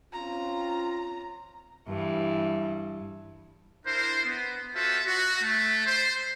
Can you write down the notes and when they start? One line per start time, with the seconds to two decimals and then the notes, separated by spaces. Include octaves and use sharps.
0.13 C4 C#4 F4 A#5
1.88 G2 E3
3.86 D4 E4 A#4 C5
4.24 B3
4.74 F4 F#4 A4 C5 E5
5.06 F#4
5.41 A3
5.86 C5